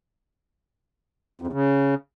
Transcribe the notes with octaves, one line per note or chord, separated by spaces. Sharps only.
F2
E2
C#3